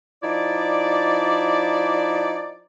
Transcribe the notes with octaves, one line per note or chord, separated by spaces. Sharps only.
F3 D#4 E4 D5